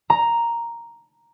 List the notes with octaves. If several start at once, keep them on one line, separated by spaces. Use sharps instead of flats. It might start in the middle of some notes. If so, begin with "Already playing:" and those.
A#5